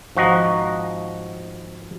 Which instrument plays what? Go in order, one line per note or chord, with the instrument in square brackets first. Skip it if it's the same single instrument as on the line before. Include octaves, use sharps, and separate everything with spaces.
[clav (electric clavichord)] G#1 F3 F#4 D#5 A#5